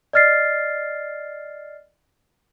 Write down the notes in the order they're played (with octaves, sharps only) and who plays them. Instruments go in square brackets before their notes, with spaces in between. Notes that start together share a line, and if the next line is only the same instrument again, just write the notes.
[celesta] D5 D#5 F6 A6 C7